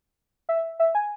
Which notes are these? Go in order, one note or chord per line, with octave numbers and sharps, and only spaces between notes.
E5
E5
G#5